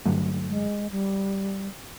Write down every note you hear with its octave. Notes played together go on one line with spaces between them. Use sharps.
G2 D3 F#3 A3
G#3
G3